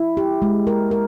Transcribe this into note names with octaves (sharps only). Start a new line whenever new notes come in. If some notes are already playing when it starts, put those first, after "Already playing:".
Already playing: E4
G4
G#3
A#4
A#4